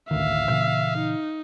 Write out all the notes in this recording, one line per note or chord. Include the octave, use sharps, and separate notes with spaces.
A1 D2 D#3 E5 F5
A#2 C#3 E3
D#4